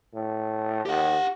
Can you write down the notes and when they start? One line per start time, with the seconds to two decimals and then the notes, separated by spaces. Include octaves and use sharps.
0.14 A2
0.86 D#2 G4 F#5